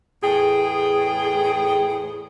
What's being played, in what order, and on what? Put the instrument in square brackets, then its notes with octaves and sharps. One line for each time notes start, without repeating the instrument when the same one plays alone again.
[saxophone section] E2 A2 G#4 [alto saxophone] G5